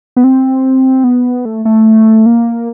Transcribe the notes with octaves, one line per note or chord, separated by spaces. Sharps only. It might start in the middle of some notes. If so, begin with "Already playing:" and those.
B3
C4
B3
A3
A3
A#3